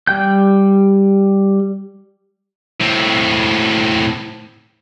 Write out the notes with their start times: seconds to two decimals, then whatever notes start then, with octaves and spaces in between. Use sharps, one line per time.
0.07 G3 G5 G6
2.80 A2 C4